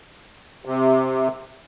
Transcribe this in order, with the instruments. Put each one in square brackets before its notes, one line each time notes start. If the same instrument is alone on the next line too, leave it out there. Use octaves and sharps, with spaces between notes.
[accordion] C3